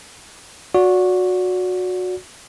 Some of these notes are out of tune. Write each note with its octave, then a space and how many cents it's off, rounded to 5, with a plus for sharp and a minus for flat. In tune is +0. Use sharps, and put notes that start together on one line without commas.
F#4 -20 D5 -30